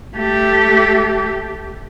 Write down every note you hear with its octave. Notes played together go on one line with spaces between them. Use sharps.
A3 G4